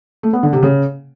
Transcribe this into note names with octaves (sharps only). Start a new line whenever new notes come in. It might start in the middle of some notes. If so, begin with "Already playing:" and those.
A3
B3
D3
C3
C#3